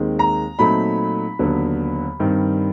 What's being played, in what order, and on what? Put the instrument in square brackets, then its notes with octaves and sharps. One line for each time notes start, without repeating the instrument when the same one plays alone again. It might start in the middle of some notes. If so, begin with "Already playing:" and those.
Already playing: [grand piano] D#2 D#3 G#3 C4
A#5
A#2 F#3 A3 C4 D#4 B5
D#2 D3 F#3 B3
G2 D#3 G3 C4